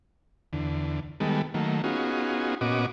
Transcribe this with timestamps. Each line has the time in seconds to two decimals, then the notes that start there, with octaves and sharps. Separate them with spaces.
0.53 E2 D3
1.20 D#3 G3 G#3 B3 A4
1.54 D#3 F#3 A3 A#3
1.84 B3 C#4 D#4 F4 F#4 G#4
2.61 A#2 B3 C#4 F#4 D#5 D6